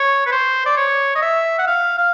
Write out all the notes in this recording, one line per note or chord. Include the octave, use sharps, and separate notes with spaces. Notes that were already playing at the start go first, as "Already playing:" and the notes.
Already playing: C#5
B4
C5
D5
C#5
D#5
E5
F#5
F5
F5